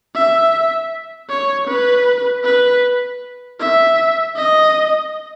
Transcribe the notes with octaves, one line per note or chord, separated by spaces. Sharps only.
E5
C#5
B4
B4
E5
D#5